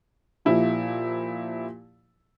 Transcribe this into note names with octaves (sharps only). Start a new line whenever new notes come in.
A#2 F3 E4 G4